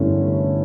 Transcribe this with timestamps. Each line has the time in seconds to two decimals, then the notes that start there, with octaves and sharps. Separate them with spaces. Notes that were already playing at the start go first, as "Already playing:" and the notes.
Already playing: G1 G2 D3 A3 C#4 E4